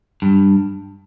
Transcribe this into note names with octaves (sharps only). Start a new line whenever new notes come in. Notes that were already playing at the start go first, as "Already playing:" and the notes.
G2